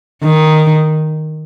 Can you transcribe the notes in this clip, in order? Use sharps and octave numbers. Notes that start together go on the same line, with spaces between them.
D#3